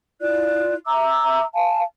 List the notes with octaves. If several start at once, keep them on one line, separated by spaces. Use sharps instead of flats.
E4 F4 D5 F#6
E5 A#5 D6 E6
F5 G#5 A5